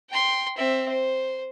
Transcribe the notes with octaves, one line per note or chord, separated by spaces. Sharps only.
G5 C6
C4 E5
C5